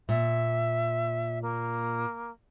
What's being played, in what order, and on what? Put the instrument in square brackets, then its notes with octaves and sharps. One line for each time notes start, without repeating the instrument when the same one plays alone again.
[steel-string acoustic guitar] A#2 [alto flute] E5
[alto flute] A#3